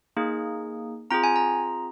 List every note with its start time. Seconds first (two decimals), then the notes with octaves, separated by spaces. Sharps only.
0.17 A#3 D#4 G#4
1.11 C4 F4 G#4 A#5
1.24 G#5
1.36 A#5